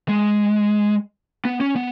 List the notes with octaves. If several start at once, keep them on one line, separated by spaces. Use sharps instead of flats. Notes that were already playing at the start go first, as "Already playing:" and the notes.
G#3
B3
C#4
B3